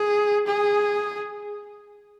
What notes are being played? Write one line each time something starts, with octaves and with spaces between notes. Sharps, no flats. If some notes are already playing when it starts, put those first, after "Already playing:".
Already playing: G#4
G#4